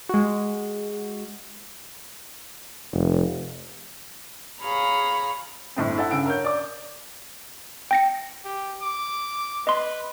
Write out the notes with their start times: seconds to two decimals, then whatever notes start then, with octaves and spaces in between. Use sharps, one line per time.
0.09 G#3 F#4
2.93 F1
4.62 G#4 C#5 F5 A#5 B5 F6
5.76 G1 A2 C4
5.97 E4 A4 F#5
6.11 G2 C#3 F#5 E6 D7
6.26 A#4 C#5 G6
6.44 D5 D6
7.91 G5 A#6 C#7
8.44 G4
8.81 D6
9.67 B4 D#5 C6